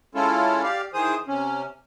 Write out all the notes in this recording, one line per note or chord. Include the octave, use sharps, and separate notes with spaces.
G#3 C#4 E4 F4 A4
G4 D5 F5
D#3 E3 G#4 C5 D#6
C3 C#4